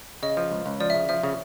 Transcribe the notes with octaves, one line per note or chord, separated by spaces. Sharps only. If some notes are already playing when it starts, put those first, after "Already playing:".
C#3 D#5
F3
C#2
C#2
F3 D5
E5
C#3
F3 E5
C#3